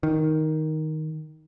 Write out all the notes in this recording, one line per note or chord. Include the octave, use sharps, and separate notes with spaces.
D#3